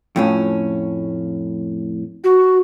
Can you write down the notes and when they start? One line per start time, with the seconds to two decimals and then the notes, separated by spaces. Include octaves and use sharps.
0.16 F2 A2 C#4
2.24 F#4